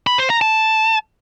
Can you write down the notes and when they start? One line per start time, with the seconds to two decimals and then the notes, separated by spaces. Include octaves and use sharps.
0.07 B5
0.18 C5
0.30 A#5
0.42 A5